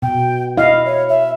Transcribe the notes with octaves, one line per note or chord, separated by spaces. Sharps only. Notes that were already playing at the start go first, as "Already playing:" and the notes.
B2 G5
E4 D#5 F5
C#5
E5